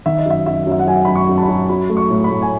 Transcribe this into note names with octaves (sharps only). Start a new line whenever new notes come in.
D#3 E5
D#5
F#2 E5
F#2 E5
F#2
E5
F#5
F#3 G#5
F#2 B5
C#6
F#2
A5
B5
F#2
F#3 B5
A3
C#6
A2
B5
A2
G#5